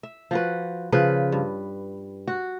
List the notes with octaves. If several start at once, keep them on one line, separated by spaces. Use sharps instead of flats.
E5
F3 F#4 B4
C#3 F3 B4
G2
F#4